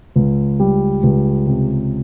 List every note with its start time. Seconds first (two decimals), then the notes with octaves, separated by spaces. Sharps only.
0.16 C#2
0.60 G3
1.03 C#2
1.47 C3